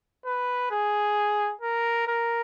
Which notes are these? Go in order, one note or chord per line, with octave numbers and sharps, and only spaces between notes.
B4
G#4
A#4
A#4